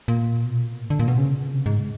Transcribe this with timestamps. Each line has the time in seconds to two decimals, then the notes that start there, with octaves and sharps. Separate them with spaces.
0.08 A#2
0.45 B2
0.63 A#2
0.81 A2
0.90 D3
0.99 A#2
1.08 B2
1.18 C#3
1.53 C3
1.66 G#2